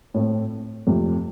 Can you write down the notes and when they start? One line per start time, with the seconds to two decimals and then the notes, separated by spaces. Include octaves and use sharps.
0.14 A2 A3 C4
0.87 F2 C3 A3